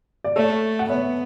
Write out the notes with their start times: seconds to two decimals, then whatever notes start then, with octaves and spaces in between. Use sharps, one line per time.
0.24 D5
0.36 A3 A4 C#5
0.79 F#5
0.89 B3 C#5 E5